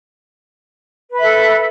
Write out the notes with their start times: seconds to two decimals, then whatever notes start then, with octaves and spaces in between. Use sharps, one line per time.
1.12 B4
1.15 B5
1.19 E5
1.22 A4